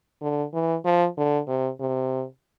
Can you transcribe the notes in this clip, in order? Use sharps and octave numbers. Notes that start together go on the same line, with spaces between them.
D3
E3
F3
D3
C3
C3